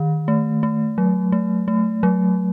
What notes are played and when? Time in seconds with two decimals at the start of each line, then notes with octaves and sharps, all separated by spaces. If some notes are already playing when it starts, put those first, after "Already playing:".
Already playing: D#3
0.28 A3
0.63 A3
0.98 F#3
1.32 A3
1.68 A3
2.03 F#3